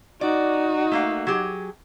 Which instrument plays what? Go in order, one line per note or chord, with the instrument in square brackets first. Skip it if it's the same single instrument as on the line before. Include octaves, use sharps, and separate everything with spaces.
[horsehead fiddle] D#4 F#4 [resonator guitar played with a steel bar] D5
[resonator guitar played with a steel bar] A3 A#3 F5
F#3 G4 G#4